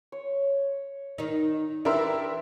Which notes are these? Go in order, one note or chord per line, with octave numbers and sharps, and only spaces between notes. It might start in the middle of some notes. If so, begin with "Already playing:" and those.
C#5
D#3 D#4
E3 D4 E4 G4 A#4 E5 C6